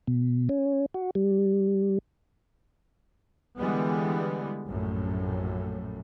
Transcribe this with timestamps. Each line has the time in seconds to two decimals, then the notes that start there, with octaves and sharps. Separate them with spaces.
0.07 B2
0.49 C#4
0.94 F#4
1.15 G3
3.58 D3 E3 G3 G#3 B3
4.67 A#1 F#2 A2